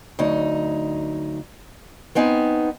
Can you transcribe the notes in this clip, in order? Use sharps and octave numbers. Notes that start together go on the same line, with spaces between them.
D2 F#3 D#4
B3 C4 D#4 G#5